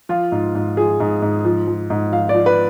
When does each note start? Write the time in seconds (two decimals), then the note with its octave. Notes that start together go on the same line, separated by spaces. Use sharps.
0.09 F3 F4
0.32 G#2
0.55 G#2
0.77 F3 G#4
1.00 G#2
1.22 G#2
1.45 F3
1.67 F3
1.90 G#2
2.12 F3 F5
2.29 D5
2.35 F3
2.46 B4